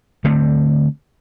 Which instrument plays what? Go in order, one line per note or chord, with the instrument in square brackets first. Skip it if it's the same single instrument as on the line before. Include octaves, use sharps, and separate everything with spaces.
[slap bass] D3 A3 C4